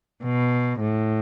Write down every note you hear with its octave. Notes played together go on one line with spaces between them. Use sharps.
B2
A2